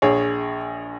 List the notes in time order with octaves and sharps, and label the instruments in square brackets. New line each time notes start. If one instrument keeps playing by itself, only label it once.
[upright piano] A#1 G#4 C#5